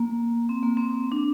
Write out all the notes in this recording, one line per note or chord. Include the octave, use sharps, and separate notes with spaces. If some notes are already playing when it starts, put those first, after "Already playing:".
Already playing: A#3
C4
A#3
C4
D4